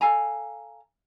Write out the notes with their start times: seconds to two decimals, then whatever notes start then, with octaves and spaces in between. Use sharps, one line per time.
0.01 A4 F5 G#5 A#5